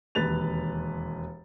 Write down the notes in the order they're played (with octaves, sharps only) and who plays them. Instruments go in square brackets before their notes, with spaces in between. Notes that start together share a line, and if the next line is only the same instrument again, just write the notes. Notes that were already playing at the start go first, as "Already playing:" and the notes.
[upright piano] E1 D#2 B4 A6 F7